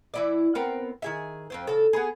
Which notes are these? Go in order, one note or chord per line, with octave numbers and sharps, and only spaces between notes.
E3 E4 D5
B3 C4 A#4
D#3 G#4 E5
F2 C4 C5
C#3 A4
B3 G#4